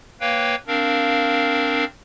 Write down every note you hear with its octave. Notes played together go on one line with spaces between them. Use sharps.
A#3 B4 C#5 F5 G5
C4 D4 A#4 F5